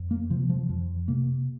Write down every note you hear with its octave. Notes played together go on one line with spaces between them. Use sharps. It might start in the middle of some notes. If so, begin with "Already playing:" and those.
Already playing: F2
A#3
C3 F3
F3
F2 F3
C3 A#3